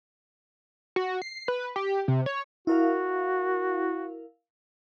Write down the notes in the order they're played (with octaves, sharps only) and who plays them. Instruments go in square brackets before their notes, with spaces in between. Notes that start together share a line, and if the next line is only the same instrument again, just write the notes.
[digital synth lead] F#4
C7
B4
G4
C3
C#5
[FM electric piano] E4 A#4 F5 [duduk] F#4